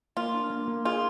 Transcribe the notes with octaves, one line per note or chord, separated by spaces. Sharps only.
A#3 F4
D4
A#3
A#3
F4 G#4